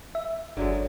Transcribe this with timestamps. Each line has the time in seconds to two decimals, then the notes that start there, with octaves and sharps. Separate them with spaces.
0.15 E5
0.57 G1 D3 F#3 G#3